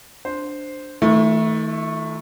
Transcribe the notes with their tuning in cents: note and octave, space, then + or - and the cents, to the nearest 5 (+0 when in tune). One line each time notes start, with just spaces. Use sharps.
D4 +0 C5 +0
D#3 +45 A3 +0 F4 +0